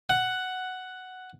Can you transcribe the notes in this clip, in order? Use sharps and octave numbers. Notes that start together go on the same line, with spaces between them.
F#5